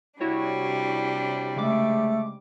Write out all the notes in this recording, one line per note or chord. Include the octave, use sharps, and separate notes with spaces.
C3 G3 D4 E4 F#4 C#5
C#3 G#3 A3 D6